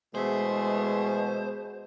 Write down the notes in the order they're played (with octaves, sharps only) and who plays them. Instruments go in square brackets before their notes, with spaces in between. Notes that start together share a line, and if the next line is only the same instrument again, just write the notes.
[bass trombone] B2 [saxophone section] E3 A3 G#4 [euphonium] G#3 [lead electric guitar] C5